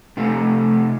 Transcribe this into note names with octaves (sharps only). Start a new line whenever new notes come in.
C3 F3 A3